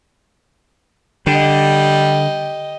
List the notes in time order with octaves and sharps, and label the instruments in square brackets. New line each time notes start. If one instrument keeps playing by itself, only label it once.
[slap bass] D3 [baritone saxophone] G3 [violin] G4 D#5